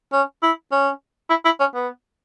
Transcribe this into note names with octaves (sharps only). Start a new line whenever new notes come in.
C#4
E4
C#4
E4
E4
C#4
B3